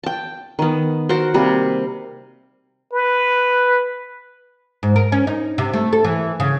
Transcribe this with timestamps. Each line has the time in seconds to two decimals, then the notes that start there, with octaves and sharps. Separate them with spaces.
0.03 G5 A5
0.59 D#3 B3
1.09 F#4 A#4 C5
1.34 C3 G3 A#3
2.93 B4
4.83 G#2
4.96 A#4
5.12 C#4
5.27 D#4
5.58 C3
5.73 A3
5.93 A4
6.05 E3
6.40 C#3